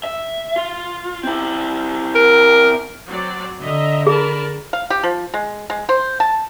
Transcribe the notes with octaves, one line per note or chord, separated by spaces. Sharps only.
E5
F4
C4 E4
A#4
F#3 C4 D5
D3 D#5 E5 A#5
G#4 A#4 A5 B5
F5
G4
F3
G#3
G#3
C5
A5